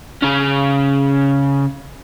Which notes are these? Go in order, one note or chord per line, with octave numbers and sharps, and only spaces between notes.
C#3 C#4